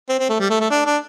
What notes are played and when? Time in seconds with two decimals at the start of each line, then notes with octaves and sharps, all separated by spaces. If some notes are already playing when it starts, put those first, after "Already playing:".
0.09 C4
0.19 C4
0.29 A3
0.40 G3
0.50 A3
0.60 A3
0.71 D4
0.86 D4